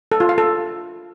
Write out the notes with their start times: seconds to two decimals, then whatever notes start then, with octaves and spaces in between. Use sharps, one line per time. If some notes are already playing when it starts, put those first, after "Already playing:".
0.12 A4
0.20 F4
0.29 F5
0.38 A4